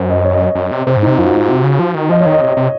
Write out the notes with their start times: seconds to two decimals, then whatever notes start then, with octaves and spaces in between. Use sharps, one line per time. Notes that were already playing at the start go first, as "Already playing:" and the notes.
Already playing: F#2 C5
0.10 D#5
0.25 C#5
0.33 D#5
0.41 C#5
0.55 F#2
0.71 C3
0.87 C3 C5
0.97 G#2
1.03 C3 D#4
1.18 F#2 F4
1.26 F#4
1.33 G#2 F4
1.48 C3 F#4
1.64 C#3
1.79 F3
1.95 D#3
2.10 F3 D#5
2.21 C#5
2.26 D#3
2.32 D#5
2.41 C3
2.57 C3